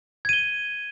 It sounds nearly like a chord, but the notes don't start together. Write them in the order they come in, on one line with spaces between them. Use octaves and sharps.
G#6 D#7 G7